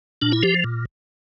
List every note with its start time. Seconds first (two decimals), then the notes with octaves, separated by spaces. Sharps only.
0.22 A#2 D4
0.32 E4
0.43 F3 G4
0.64 A#2